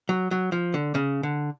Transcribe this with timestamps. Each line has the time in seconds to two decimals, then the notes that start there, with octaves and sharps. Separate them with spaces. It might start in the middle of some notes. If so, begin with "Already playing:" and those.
0.09 F#3
0.31 F#3
0.52 F3
0.74 D3
0.95 C#3
1.23 D3